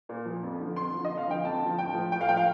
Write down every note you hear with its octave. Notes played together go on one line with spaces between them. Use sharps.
A#2
F3
F2
D3 F3
F2 C6
D3 F3
D#5
F2
F5
D3 F3 G5
F2 A5
D3 F3
A2 G5
F3
A2 G5
F5
F3 G5
F5